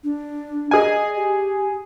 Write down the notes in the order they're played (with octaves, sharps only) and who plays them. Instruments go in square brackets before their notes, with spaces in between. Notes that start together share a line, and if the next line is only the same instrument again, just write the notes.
[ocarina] D4
[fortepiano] G#4 G#5 [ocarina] D#5
[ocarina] G4